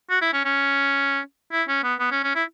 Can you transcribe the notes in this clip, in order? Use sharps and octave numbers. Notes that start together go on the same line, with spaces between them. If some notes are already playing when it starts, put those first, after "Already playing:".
F#4
E4
C#4
C#4
E4
C#4
B3
B3
C#4
C#4
E4